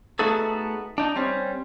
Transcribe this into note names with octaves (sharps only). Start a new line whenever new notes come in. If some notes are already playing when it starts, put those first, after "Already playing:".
A3 B3 D#4 F#4 G#4 A4
D4 D#4
G3 C4 C#4